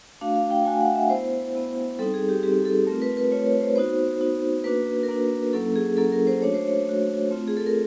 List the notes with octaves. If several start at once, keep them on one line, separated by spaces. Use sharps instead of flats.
A3 D4 F#4 F5
F5
G5
A3 D4 F#4 G#5
F#5
E5
B3 E4 C5
B3 E4
G3 C4 D#4 A4
G#4
G4
G3 C4 D#4 G4
A4
A3 C4 F4 A#4
B4
B4
A3 C4 F4 C#5
C#5
C5
B3 D#4 F#4 C5
B3 D#4 F#4
A#3 D4 F#4 B4
A#4
A#3 D4 F#4 B4
F#3 A#3 C#4 E4 A4
G#4
F#3 A#3 C#4 E4 A4
A#4
C5
A3 D4 F#4 C#5
C5
C#5
A3 D4 F#4
A3 C4 F4
G#4
A4
A#4